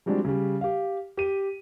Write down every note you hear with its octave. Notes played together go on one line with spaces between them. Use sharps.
F3 G3 G#3 C4 D4 F#4
C#3 G3
G4 F5
G4 D#7